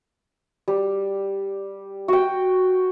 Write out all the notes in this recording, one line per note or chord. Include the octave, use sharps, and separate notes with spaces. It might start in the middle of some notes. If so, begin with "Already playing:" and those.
G3
F#4 G5